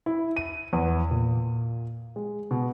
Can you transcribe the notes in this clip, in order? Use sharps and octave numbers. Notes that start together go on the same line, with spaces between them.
E4
D#7
E2
A#2
G#3
B2